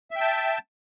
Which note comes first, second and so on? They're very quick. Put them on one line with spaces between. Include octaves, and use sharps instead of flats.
E5 G5 A5